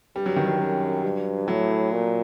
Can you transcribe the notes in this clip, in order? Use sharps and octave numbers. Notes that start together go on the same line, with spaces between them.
G2 G3
F#3
D#3
F#3
F#2
G2
A2 F#3
A#2